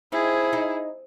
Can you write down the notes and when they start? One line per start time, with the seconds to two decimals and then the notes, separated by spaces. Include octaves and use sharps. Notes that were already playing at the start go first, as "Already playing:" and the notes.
0.12 C4 D#4 E4 G#4
0.53 D#4